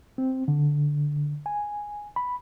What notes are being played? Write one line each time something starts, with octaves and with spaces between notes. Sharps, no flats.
C4
D3
G#5
B5